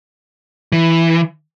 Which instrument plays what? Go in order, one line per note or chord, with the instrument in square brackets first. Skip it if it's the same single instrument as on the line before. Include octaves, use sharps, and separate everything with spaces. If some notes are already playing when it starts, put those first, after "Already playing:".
[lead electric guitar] E3